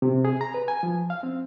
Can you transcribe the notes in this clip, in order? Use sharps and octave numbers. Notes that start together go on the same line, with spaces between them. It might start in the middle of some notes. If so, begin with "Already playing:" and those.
C3
G#4
A#5
B4
G#5
F3
F5
C4